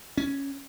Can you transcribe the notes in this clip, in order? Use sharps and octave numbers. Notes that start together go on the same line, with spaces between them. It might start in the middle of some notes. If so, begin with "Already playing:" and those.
C#4